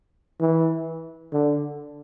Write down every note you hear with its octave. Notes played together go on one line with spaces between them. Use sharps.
E3
D3